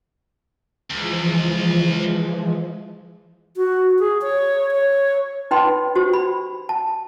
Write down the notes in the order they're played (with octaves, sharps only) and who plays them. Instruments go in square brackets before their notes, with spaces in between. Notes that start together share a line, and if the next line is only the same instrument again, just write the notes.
[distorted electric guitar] C#2 [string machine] E3 F3 G#3
[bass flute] F#4
G#4
C#5
C#5
[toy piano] D#4 B4 D#5 G5 B5 C6
F#4 G4 C5
B5
A5